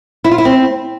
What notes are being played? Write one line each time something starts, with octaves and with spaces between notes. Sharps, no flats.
E4
F4
E4
C4